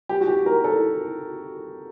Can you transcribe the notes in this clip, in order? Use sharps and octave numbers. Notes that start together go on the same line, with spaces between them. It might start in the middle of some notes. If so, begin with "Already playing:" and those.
G4
F#4
G4
A#4
A4